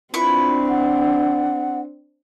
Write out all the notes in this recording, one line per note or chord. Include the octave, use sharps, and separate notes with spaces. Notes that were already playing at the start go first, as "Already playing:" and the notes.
C4 D4 E4 F4 B4 C#6
F#5